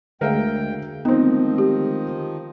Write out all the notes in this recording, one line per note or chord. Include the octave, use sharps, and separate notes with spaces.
D2 D3 G#3 A3 A#4 E5 F5 G5
D#3 F3 B3 C4 D#4
G4